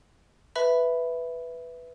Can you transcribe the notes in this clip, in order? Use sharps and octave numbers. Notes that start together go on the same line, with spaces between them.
B4 E5 B5